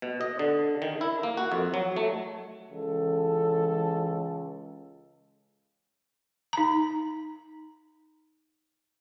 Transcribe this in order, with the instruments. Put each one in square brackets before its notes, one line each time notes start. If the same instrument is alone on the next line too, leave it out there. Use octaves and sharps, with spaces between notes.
[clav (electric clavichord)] B2
D#5
D3
D#3
E4
A#3
F#4
F2
F#3
A3
[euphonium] C#2 [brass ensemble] E3 C#4 A4
[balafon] D#4 A#5